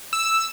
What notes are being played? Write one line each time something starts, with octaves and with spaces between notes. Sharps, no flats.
E6